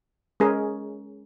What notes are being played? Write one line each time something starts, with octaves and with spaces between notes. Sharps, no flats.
G#3 C#4 G#4 A#4